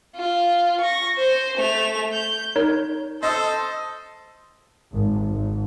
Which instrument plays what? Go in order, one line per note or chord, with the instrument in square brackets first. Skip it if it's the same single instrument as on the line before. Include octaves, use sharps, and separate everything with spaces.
[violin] F4
C#6 A#6
C5
A3 F7
G6
[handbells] D#4 A#4 C#5
[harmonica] A4 C5 [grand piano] D#5 D#6 E6
[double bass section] G#1
G#1